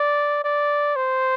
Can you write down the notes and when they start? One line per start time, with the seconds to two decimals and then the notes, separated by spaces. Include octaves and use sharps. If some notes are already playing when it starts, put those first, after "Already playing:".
Already playing: D5
0.44 D5
0.96 C5